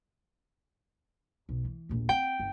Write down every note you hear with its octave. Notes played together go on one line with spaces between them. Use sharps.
B1
E3
A#1 D#2
C4 G5
G1